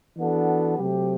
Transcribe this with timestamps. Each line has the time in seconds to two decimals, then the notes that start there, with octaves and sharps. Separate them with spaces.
0.17 E3 B3 D4 F#4 A4
0.77 C3 F#3 A3 C4 G4